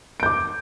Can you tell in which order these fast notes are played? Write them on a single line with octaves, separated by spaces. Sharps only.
D7 G6 D6